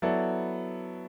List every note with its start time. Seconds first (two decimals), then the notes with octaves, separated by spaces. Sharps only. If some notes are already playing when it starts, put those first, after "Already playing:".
0.02 F#3 B3 E4 A4 D5